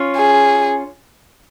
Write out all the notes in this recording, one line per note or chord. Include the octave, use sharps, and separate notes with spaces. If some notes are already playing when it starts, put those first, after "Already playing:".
Already playing: C#4 F4
G#4